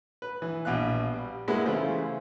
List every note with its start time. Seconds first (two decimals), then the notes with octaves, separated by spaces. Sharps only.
0.22 B4
0.42 E3
0.65 A#1 B2 F5 F#6
1.14 G3
1.48 G3 G#3 A#3 B3 E4 F#5
1.66 C#3 E3 A3 E4 F4 C5